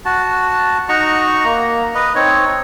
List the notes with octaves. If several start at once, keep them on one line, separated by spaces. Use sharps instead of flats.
F#4 A5
D#4 F#4 A#5 C#6
A#3 A#5
B4 D#5
C4 D#4 C#5